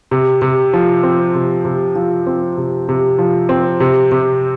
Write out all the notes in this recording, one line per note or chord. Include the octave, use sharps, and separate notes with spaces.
C3
C3
F3
C4
C3
C3
F3
C4
C3
C3
F3
C4
C3
C3